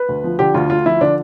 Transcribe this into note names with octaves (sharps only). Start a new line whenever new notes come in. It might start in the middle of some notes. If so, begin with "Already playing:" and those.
Already playing: B4
D2
F3
D3 G4
D2 F4
D2 F4
F3 E4
D3 D4